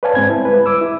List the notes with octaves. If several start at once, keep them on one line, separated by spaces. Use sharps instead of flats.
B4 C#5 D5 F5 G#5 A5
G#2 G#3 C4 G#6
E4
G3 G#3 B4
D6 E6
E4